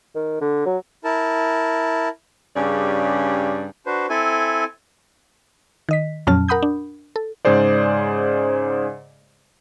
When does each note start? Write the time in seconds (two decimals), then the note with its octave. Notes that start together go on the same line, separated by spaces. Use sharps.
0.15 D#3
0.41 D3
0.65 F#3
1.04 E4 A#4 A5
2.55 G2 C#3 C#4 G4 G#4 D5
3.86 D4 F#4 B4 C5
4.10 C4 E4 A4 G#5
5.89 D#3 D#5 B6
6.27 F2 A#2 F#3 C#4 A5 F6
6.48 A#4 F#5 B5 D#6 G6
6.63 D4
7.16 A4
7.45 G#2 C#3 G#4 C5 D5